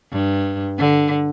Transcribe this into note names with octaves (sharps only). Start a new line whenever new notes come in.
G2
D3